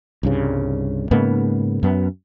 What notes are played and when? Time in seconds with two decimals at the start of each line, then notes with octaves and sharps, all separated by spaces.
0.23 C2 G2 C#3
1.11 G#2 C#3 A#3 B3
1.83 F#2 B3